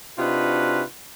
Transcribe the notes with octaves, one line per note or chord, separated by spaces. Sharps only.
C3 D4 D#4 F4 F#4 B4